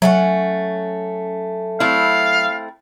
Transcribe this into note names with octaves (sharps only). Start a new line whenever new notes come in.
F#3 A3 C#4 F#5
A3 C4 E4 F5